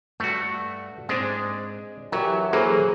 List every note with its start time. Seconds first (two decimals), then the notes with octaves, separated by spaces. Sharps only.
0.20 G2 A3 F#4
1.09 G#2 G#3 C4 D4
2.12 E3 F#3 F#4 G4 A#4 E5
2.53 E3 F#3 A#3 G#4 A4 C5